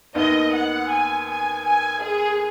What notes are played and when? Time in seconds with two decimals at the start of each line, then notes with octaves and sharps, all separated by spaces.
0.15 D#2 D#3 B3 D#4 D#5
0.53 F#5
0.89 G#5
1.28 G#5
1.65 G#5
2.02 G#4